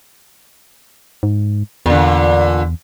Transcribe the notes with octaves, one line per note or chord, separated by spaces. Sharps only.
G#2
E2 A#2 D3